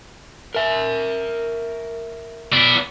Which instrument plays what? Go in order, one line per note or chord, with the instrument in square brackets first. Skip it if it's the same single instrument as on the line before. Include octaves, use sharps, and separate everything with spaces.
[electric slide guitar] A#4 E5
[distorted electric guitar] B3 D5